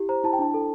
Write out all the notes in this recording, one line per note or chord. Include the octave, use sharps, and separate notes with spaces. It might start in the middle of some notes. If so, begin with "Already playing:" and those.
Already playing: E4 G4
C5 A#5
E4 A5
G5
D4 A5
A4